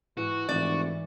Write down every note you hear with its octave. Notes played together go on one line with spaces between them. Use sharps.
G#2 E3 F#4
F1 G#2 E3 D5